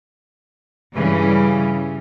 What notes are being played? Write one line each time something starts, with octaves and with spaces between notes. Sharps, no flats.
G2 C#3 E3 G3